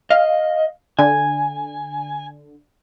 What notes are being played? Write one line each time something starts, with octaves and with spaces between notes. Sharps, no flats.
D#5 F5
D3 G#5